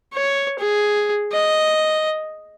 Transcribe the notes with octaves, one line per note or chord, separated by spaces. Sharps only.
C#5
G#4
D#5